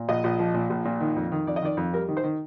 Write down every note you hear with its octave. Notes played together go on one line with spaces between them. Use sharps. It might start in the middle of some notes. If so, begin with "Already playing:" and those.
Already playing: A#2
A#1 D#5
A#1
F3
A#2
A#1
A#2
D#3
F2
D#3
F2 D5
D#5
D#3 D5
F2
G3 A#4
D#3
C5
D#3